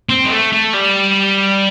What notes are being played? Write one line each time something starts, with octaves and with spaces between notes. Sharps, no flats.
C4
G#3
A3
A3
G3